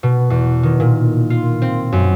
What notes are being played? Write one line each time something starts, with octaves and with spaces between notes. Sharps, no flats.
B2
E2
D#3
A#2
F4
C4
F#2